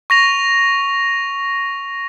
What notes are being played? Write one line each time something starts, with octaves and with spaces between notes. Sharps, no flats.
C#6 A#6 F7